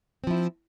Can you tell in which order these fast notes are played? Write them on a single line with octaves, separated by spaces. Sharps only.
C4 F3 E4